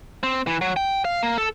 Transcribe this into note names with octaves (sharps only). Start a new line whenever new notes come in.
C4
E3
F#3
G5
F5
A#3
A4